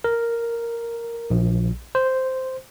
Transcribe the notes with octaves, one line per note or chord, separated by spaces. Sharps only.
A#4
A#1
C5